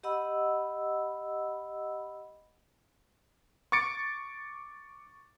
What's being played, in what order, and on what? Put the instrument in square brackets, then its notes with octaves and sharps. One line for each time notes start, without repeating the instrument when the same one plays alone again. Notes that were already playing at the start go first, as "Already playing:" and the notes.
[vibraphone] G4 D#5 F#5 B5 E6
[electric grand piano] C#6 D6 A6 C#7 D7